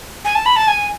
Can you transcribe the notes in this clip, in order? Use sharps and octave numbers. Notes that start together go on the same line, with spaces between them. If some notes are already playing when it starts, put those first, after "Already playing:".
G#5
A5
B5
A5
G#5